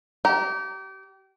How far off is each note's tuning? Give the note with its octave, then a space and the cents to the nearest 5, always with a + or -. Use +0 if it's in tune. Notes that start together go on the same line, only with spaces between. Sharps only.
G4 -30 A#5 +0